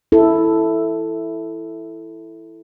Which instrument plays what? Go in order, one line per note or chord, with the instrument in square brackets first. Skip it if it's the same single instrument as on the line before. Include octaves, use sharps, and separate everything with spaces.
[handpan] E4 A4